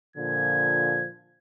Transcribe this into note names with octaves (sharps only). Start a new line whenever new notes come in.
A#2 D3 F3 G#6